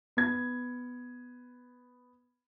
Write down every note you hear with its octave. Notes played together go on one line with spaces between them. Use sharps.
B3 G#6